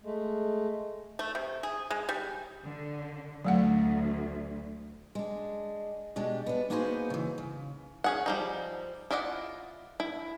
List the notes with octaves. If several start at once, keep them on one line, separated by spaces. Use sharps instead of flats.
G#3 A3
A3
C3
G#4
G#3
G3
D3
D2 F#3 A3 F#5
G#3 D4
B2 G#3 D4 G4
B3 D4
A#3 B3 D#4 F#4 G#4 C5
C#3 E3
C#3
C#4 G#4 F#5
F3 G3 D#4
E4 F4 D5 D#5 F#5
E4